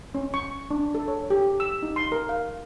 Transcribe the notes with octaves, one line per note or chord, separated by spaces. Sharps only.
C#4
C#6
D4
A4
C#5
G4
E6
D#4
C6
A#4
F5